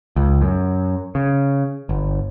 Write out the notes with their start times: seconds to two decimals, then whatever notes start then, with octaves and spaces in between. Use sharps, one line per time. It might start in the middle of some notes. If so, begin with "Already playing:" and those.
0.16 C#2
0.42 F#2
1.15 C#3
1.89 G1